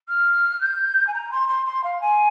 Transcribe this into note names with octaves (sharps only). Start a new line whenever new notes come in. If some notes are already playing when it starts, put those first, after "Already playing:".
F6
G6
G#5
A#5
C6
C6
C6
F5
G#5